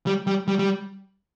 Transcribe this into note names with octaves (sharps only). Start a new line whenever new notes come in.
G3
G3
G3
G3